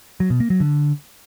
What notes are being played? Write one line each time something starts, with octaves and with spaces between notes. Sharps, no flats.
F#3
B2
A#3
F#3
D3